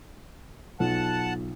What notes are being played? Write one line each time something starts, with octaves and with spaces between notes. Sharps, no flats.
B1 F4 F#5 A5